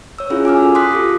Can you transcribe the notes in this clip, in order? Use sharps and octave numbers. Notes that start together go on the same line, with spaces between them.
C#5 E6
C#4 E4 F4 G#4
G#5 D6 E6 F6
F#4 A4
C6 D6 D#6 F#6 B6
F4 G4 A4